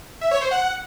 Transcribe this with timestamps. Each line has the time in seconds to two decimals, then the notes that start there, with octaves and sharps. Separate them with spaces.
0.21 E5
0.31 C#5
0.41 C5
0.51 F#5